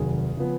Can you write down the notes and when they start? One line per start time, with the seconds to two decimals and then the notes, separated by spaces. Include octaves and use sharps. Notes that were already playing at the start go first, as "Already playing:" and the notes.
Already playing: F1 D#2 D#3 F#3 G#4
0.37 C#3 F3 B3